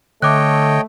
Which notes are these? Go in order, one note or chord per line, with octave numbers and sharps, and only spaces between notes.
D3 A3 C#5 D#5 G5 D6 F#6